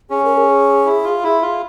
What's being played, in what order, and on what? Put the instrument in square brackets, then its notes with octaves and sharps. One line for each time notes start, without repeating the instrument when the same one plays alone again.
[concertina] C#4 [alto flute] G#4
[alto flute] A#4
G#4
[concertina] E4
F4
E4
F4